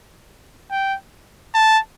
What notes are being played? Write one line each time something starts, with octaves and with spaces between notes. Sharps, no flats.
G5
A5